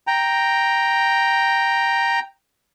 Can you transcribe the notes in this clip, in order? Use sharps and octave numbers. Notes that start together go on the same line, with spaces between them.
G5 A#5